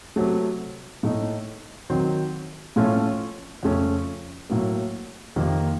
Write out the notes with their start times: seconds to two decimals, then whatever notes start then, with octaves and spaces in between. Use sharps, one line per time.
0.16 C3 F#3 A3
1.03 A2 A3 D#4
1.90 D#3 F#3 C4
2.76 A2 F3 A3 C#4 F4
3.63 F2 C#3 A3 C#4
4.50 A2 F#3 A#3
5.36 F2 C3 D#3 A#3